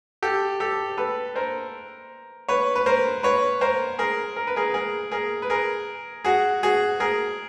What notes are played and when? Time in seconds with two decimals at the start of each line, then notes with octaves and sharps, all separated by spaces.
0.23 G4 A4
0.60 G4 A4
0.97 A4 B4
1.35 A#4 C5
2.49 B4 C#5
2.75 B4
2.86 A#4 C5
3.23 B4 C#5
3.61 A#4 C5
3.99 G#4 A#4
4.36 A#4
4.47 B4
4.56 G#4 A#4
4.74 G#4 A#4
5.12 G#4 A#4
5.42 B4
5.50 G#4 A#4
6.25 F#4 G#4
6.63 F#4 G#4
7.00 G#4 A#4